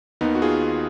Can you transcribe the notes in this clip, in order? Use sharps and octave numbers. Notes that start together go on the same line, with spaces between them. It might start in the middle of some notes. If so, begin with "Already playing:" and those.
D#2 D#3 B3 D#4
F#4
F4 G#4